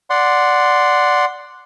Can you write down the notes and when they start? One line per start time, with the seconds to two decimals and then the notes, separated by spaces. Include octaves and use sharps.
0.10 D5 F#5 C6